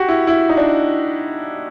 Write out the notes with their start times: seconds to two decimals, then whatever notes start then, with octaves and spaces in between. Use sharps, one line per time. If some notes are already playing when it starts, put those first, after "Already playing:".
Already playing: F#4 G4
0.09 E4
0.27 E4
0.49 D#4
0.57 D4